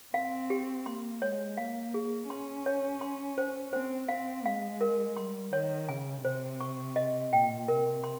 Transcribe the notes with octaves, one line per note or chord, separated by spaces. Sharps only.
C4 F5
G4
A#3 C6
G#3 C#5
A#3 F5
G#4
C#4 C6
C#5
C6
C5
C4 C5
C4 F5
G#3 F5
A#4
G3 C6
D#3 C#5
C#3 G#5
C3 C5
C#6
D#5
A#2 G5
C3 A#4
C6